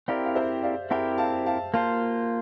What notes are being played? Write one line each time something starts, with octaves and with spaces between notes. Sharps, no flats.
C4 E4 G4 A#4 D5 F5
F5
C5 E5
D5 F5
C4 E4 G4 A#4 E5 G5
F5 A5
F5 A5
A#3 F4 C5 F5 A5